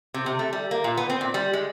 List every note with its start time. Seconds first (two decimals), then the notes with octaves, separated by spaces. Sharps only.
0.14 C3
0.26 C3
0.39 A3
0.53 G3
0.71 A#3
0.84 A#2
0.97 B3
1.09 C4
1.21 A#2
1.34 G3
1.53 G#3